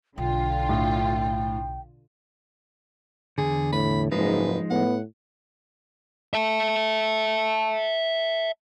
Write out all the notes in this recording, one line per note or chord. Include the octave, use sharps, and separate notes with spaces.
B1 D3 F4 G5
A2
E2 G2 D3 G#4
A2 B5
F#1 G#2 F3 G#3 D#4 B4
A2 B3 F#5
E5 A5